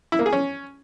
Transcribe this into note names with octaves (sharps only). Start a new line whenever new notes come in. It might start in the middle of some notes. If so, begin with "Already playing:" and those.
E4
A#3
G#4
C#4